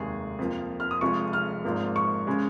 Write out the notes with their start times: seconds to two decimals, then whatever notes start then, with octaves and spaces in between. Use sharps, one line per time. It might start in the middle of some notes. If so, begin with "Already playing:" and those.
Already playing: F1 D#2 D#3 G#3 G#4
0.39 F2 F3 A#3
0.80 F6
0.91 D#6
1.01 F1 F2 F3 G#3 C#6
1.33 F6
1.64 G#1 G#2 F3 A#3
1.96 C#6
2.27 C#3 G#3